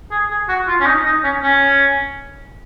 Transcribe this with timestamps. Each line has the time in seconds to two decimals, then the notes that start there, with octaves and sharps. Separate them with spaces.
0.11 G#4
0.31 G#4
0.49 F#4
0.68 F4
0.80 C#4
0.86 D#4
1.05 D#4
1.24 C#4
1.42 C#4